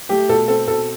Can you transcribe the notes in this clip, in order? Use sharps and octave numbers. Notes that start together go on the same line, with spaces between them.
A3 G4
B2 A4
C4 A4
B2 A4